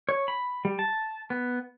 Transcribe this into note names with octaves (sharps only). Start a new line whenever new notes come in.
C#5
B5
G3
A5
B3